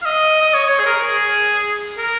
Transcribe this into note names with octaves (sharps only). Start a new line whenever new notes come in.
F5
D#5
D#5
C#5
C#5
G#4
A#4
G#4
A#4